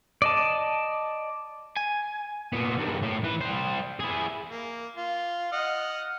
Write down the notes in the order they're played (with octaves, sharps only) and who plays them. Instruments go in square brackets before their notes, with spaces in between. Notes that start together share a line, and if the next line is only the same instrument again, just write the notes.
[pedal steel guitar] D5 D#5 A5
[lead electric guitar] G#5
[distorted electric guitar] A#2 B3
G2 D#3
A2
E3 B4
G3 C5
E4 G#4
[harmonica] A#3
F4
D#5 F#5 F6